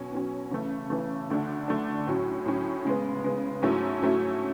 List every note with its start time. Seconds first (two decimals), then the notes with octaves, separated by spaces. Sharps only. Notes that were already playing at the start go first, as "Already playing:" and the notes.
Already playing: B2 F#3 C#4
0.12 B2 F#3 C#4
0.51 C#3 E3 A3
0.90 C#3 E3 A3
1.30 D2 D3 A3 D4
1.68 D2 D3 A3 D4
2.07 A2 F#3 C#4
2.46 A2 F#3 C#4
2.85 C#3 G#3 B3
3.24 C#3 G#3 B3
3.62 G#2 F#3 A3 C#4 E4
4.01 G#2 F#3 A3 C#4 E4